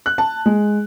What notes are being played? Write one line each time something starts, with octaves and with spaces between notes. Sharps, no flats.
F#6
A5
G#3